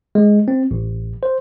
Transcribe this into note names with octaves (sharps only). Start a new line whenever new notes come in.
G#3
C4
A1
C5